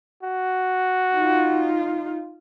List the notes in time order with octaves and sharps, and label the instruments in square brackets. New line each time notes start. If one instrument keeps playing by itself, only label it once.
[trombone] F#4
[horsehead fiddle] D#4 F4